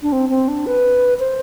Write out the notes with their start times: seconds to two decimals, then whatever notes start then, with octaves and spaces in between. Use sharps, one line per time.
0.02 D4
0.12 C4
0.30 C4
0.48 D4
0.66 B4
1.19 C5